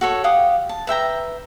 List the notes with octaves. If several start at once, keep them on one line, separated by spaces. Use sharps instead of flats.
F#4 A4 C#5
G4 F5 F#5 D#6
A5
B4 E5 G5 A#5